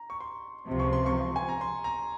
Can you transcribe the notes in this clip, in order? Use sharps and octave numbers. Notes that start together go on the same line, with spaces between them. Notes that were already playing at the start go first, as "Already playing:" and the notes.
Already playing: A#5
C#6
C6
C#2 C3 F3
C#6
C6
C#6
G#5
A#5
C6
A#5